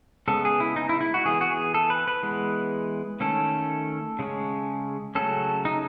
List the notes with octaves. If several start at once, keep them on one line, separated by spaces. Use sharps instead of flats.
C#3 G#3 B3 A4
G#4
E4
D#4
E4
E4
F#4
E3 B3 G#4
F#4
G#4
A4
B4
B4
E3 G#3 B3
D#3 A3 C#4 A4
C#3 G#3 C#4
C#3 F#3 A3 C#4 A4
D#4